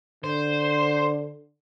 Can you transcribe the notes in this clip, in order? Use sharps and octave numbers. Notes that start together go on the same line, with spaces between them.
D3 C5